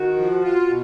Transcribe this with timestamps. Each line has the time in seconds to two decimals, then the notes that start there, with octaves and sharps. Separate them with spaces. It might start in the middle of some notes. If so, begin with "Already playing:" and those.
Already playing: D#3 F#4
0.17 F3
0.42 F4
0.68 B2